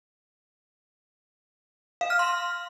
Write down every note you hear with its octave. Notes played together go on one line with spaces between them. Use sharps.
F5
F6
C6